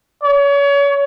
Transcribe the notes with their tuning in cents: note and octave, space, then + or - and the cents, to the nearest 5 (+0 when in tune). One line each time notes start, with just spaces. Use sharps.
C#5 +30